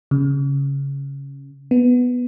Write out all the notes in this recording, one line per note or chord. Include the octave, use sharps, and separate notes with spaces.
C#3
B3